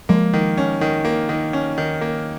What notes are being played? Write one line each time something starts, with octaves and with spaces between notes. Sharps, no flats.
F3 G#3 A#3
D#3
C#4
D#3
A#3
D#3
C#4
D#3
A#3